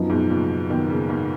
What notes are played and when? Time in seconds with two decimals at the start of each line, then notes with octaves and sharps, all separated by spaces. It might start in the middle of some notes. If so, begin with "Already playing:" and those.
Already playing: F#2 F3 B3 D#4
0.10 G#2 B2
0.30 A#2 C#3
0.70 B2 D#3
0.90 A#2 C#3
1.09 G#2 B2